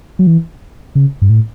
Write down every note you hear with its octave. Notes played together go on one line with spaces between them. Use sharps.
F#3
E3
C#3
G2
A2